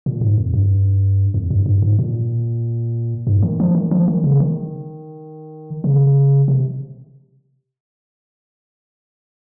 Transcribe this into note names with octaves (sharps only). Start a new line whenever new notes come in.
A#2
G#2
F2
G2
F2
G2
G2
G#2
A#2
G2
D#3
F3
D#3
F3
D#3
C#3
D#3
C#3
C3